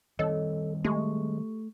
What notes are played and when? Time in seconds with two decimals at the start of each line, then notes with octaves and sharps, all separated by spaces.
0.19 D#3 G3 C4 A4 C#5 D#5
0.84 G#3 A3 G4 C#6